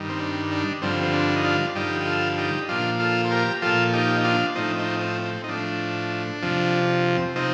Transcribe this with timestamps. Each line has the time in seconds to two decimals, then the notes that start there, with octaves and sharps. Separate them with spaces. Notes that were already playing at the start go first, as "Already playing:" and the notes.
Already playing: G2 D#3
0.09 C4
0.20 D4
0.51 D4
0.82 G2 D3 F3 C4
1.03 C4
1.13 D4
1.36 D#4
1.44 D4 F4
1.75 G2 D3 F3 D#4 G4
2.01 G4
2.06 F4 A4
2.38 D#4 G4
2.69 A#2 F3 D4 F4
3.00 F4 A4
3.25 C5
3.31 G4 A#4
3.62 A#2 F3 F4 A4
3.93 D#4 G4
4.16 D#4
4.24 D4 F4
4.55 A2 F3 C4 D#4
4.79 C4 D#4
5.02 C4
5.25 C4
5.44 D#4
5.49 A2 F3 D4
6.42 F2 C3 F3
7.36 C3 F3 C4 D#4